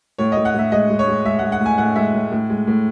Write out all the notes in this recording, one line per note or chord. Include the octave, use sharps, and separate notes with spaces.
A2 C#5
A2 D#5
F#5
A2 E5
G#3 D#5
G#3
C#5
G#3
G#3 E5
G#3 F#5
F#5
A2
G#5
A2 F#5
G#3 E5
A2
A2
G#3
A2